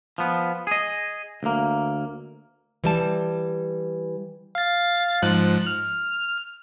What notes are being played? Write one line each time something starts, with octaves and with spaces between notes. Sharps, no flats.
F3 B3
G#4 D#5
D2 A#3
E3 G3 A5
F5 A6
G#2 F3 F#6
F6